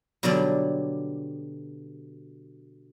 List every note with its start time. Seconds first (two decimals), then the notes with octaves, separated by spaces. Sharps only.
0.23 B2 D3 F#3 G3 D5